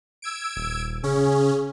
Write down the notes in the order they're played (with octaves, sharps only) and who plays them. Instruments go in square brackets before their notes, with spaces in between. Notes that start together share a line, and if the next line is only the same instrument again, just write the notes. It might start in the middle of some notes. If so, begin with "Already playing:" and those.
[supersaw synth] E6 G#6 D7
[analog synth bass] D#1
[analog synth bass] C#3 [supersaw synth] C#4 [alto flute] G#4